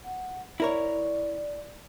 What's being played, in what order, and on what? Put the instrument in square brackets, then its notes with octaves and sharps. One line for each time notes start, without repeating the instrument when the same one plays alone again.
[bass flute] F#5
[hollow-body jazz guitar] E4 A#4 C#5 [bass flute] D5